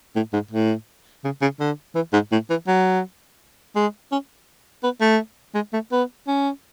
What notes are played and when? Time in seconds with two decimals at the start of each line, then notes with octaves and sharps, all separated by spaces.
0.16 A2
0.33 G#2
0.51 A2
1.24 C#3
1.42 C#3
1.60 D3
1.95 E3
2.13 G#2
2.32 A2
2.50 E3
2.67 F#3
3.75 G#3
4.12 C#4
4.83 B3
5.01 A3
5.55 G#3
5.73 A3
5.92 B3
6.27 C#4